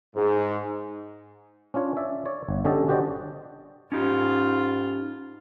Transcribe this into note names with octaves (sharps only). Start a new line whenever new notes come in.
G#2
C#4 D4 F4 C#5
D5 E5
C#5 D5
G1
D3 C#4 G4 A4 D#5 A5
D4 F#4 G4 C5 D5 D#5
G#2 C#4 D#4 F4 G4 A4